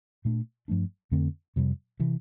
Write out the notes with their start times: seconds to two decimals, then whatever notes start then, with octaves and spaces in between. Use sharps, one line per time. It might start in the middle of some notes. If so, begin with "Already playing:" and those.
0.25 A#2 A3 D4
0.68 G2 F3 A3 D4
1.11 F2 D3 A3 C4
1.56 F2 C3 G3
1.99 C3 E3